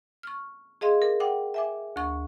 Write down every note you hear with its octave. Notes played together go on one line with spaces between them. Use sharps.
C#6 F6
G#4 D#5 F5 C6
A#4
F#5 G5 D6
E5 G#5 D6
D2 C#6